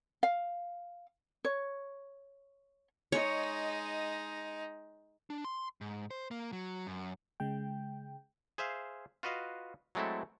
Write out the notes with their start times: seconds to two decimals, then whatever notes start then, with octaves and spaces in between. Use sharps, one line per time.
0.23 F5
1.45 C#5
3.12 G#3 D#4 C#5
5.30 D4
5.44 C6
5.81 G#2
6.11 C5
6.31 A#3
6.53 F#3
6.87 F#2
7.40 C#3 G#3 G5
8.58 G#4 C5 E5 F5
9.23 F4 F#4 B4 D#5 F5
9.95 F#3 G#3 A3 C4 E4 A4